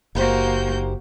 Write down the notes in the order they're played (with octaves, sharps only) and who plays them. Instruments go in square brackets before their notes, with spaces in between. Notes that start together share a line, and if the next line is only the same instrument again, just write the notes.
[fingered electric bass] F#1 [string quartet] A#3 F#4 G6 [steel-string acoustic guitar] D#4 G4 C5